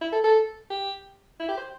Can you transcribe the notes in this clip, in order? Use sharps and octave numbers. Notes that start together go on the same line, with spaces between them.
E4
A4
A4
G4
E4
G4
C5